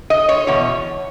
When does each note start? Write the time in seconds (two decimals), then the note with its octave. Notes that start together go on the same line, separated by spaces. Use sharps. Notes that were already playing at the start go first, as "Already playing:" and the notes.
0.10 D#5
0.29 C#5
0.47 E2 B2 C#5